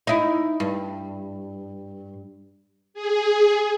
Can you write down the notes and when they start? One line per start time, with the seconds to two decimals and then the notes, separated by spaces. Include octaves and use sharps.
0.07 D#4 E4
0.60 G2
2.94 G#4